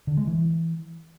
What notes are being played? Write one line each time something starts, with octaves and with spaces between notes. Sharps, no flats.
D3
G#3
E3